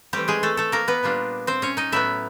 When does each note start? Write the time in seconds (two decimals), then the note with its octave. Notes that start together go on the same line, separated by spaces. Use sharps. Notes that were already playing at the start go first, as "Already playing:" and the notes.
0.13 E3 G3 A3 C4 G4
0.28 G#3 G#4
0.43 A3 A4
0.57 A3 A4
0.72 A#3 A#4
0.88 B3 B4
1.03 A#2 G3 A#3 D4 F4
1.47 C4 C5
1.62 C#4 C#5
1.77 D#4 D#5
1.92 A2 F#3 B3 E4 E5